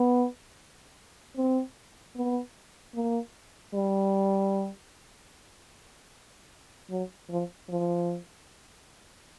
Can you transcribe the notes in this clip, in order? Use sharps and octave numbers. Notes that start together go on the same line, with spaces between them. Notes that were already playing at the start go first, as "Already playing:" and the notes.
Already playing: B3
C4
B3
A#3
G3
F#3
F3
F3